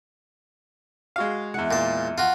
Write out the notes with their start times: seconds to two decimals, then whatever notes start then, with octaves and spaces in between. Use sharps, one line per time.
1.16 G#3 F#4 F5
1.54 E2 G#3 E4 F#5
1.71 A#2 A5
2.18 F3 F4 F#4